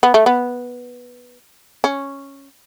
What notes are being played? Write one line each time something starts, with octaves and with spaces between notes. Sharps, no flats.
B3
A3
B3
C#4